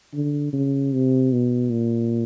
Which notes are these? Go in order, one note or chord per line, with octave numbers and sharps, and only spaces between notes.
D3
C#3
C3
B2
A#2